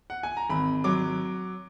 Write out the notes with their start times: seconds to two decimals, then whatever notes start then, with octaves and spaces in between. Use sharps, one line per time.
0.10 F#5
0.23 G#5
0.37 A#5
0.49 G#1 B5
0.84 F#3 D6